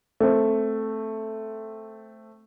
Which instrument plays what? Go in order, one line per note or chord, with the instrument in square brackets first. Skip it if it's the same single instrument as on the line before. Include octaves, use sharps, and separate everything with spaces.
[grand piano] A3 C4